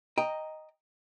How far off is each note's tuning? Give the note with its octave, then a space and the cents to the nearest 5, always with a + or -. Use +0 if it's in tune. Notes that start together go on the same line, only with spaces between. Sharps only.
D#5 +0 G5 +10 A#5 +0